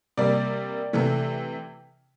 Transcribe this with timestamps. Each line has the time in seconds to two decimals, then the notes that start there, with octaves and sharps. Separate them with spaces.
0.17 C3 G3 A#3 D5
0.93 C3 E3 A3